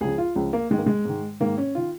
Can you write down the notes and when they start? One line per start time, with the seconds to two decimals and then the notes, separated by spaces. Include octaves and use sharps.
0.01 C#2 C#3 F3 G#4
0.18 F4
0.35 C#2 C#3 F3
0.53 A#3
0.70 G#2 D#3 G#3
0.78 A#3
0.86 G#3
1.05 G#2 D#3
1.40 G#2 D#3 A#3
1.58 C#4
1.75 D#3 F4